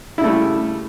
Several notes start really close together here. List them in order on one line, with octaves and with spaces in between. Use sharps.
E4 C#3 A3 G3